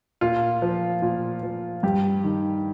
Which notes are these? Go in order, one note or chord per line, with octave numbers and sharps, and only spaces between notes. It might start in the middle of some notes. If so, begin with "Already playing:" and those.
A#2 F4
F3
A#2
F3
G2 G4
D#3